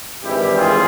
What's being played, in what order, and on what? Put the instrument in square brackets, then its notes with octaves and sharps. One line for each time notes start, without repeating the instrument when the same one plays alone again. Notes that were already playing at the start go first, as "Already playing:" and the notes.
[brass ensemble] G#1 G2 E3 G3 E4 G4
F4 G#4